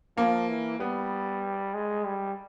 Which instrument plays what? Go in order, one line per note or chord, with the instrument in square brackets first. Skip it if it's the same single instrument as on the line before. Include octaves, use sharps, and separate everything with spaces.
[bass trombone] F3 [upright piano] A#3
[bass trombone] E3
[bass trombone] G3 [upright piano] B3
[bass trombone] G#3
G3